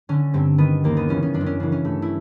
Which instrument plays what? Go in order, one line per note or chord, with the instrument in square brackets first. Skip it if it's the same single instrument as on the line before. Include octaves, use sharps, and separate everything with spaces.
[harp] D3 C#4
G2 C4
D#3 B3
D#2 A#3
B3
C#3 E3 C#4
C#4
F#2 D4
C4
C#4
C#3 E3 D4
C#4
G2 A3
E4